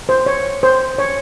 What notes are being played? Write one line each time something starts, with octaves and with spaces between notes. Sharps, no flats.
C5
C#5
C5
C#5